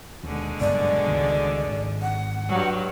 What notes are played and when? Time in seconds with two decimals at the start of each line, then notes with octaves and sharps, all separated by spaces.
0.24 D#2 B2 D3 G#3
0.60 F#1 G2 B3 D5
1.06 C#2 D#3 G3
1.67 G#1
2.02 F#5
2.49 G2 F#3 G3